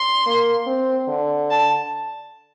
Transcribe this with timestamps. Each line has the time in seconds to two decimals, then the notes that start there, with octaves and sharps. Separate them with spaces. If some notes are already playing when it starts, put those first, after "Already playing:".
Already playing: C6
0.26 A#3
0.67 C4
1.08 D3
1.51 A5